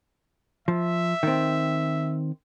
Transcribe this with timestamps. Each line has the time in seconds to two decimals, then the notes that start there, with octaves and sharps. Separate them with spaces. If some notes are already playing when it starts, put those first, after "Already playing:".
0.68 F3 E5
1.23 D#3 C4